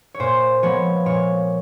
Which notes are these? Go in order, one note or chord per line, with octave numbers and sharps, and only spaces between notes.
C#5
A#2 C5
F3 G#3 B3 C#5
A#2 C#5